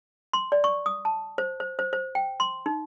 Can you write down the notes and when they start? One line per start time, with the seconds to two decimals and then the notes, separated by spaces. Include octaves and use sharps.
0.33 C6
0.52 D5
0.64 C#6
0.86 D#6
1.05 A5
1.38 C5
1.60 C5
1.79 C5
1.93 C5
2.15 G5
2.40 C6
2.66 D#4